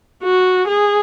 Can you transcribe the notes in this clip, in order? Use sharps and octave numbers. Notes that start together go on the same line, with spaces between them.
F#4
G#4